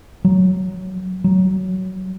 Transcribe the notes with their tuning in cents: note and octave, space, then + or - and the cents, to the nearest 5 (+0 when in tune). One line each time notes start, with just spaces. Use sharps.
F#3 +10
F#3 +15